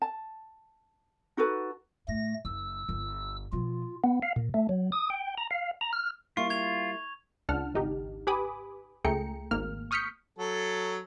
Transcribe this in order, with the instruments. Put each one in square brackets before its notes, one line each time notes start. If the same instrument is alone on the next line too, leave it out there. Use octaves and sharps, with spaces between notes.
[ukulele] A5
D#4 F#4 A4 B4
[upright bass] A2 [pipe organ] A3 A#6
[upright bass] F#1 [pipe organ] E6
[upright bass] G1
[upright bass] B2 F3 [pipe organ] F4
[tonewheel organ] B3
F5
A#2
A3
F#3
D#6
G5
A#5
F5
A#5
F6
[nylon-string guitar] G3 A#3 E4 [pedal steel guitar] F4 [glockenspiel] C#6
[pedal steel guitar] F4 [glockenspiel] G#6 F7
[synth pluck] C#2 D4 F#5 A5 F6
G#1 D#4 G4
G4 B4 G#5 B5 D6 D#6
C#2 A3 G#4 G5 A#5 C#7
G#1 A#3 F6
C#6 D#6 F6 G6 B6 C#7
[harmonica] F#3 A4